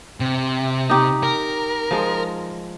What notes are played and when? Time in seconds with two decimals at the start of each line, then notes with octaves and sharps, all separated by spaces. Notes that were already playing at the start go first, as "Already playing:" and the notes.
0.20 C3
0.89 D#4 G4
1.23 A#4
1.91 F3 G#3